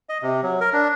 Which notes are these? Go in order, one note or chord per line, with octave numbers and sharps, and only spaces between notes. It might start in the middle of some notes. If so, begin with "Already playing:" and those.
D#5
C3
F#3
A#4
D4